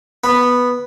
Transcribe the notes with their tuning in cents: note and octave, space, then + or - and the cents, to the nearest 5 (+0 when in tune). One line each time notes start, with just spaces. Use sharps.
B3 -5 B5 +0